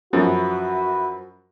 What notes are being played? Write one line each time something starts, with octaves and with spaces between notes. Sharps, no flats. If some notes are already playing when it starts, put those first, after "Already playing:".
F#2 F3 E4 F#4 B4